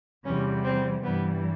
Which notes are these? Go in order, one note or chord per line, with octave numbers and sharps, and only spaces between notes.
E2 C3 E3 G3 C#4
C4
G2 E3 G3 B3